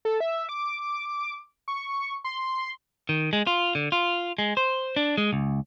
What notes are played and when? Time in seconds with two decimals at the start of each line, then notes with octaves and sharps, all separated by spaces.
0.05 A4
0.20 E5
0.49 D6
1.68 C#6
2.24 C6
3.09 D#3
3.33 G#3
3.47 F4
3.75 D3
3.92 F4
4.38 G#3
4.57 C5
4.96 D4
5.18 G#3
5.33 C#2